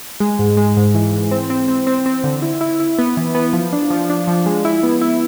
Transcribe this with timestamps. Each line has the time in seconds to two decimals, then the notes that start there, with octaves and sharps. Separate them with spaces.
0.20 G#3
0.39 G#2
0.57 G#3
0.77 G#2
0.95 E3
1.13 E3
1.31 C4
1.50 C4
1.68 C4
1.87 C4
2.06 C4
2.24 D3
2.42 E4
2.61 E4
2.80 E4
2.99 B3
3.17 E3
3.35 B3
3.53 F3
3.73 D4
3.90 F3
4.10 D4
4.27 F3
4.46 G#3
4.65 E4
4.83 B3
5.01 E4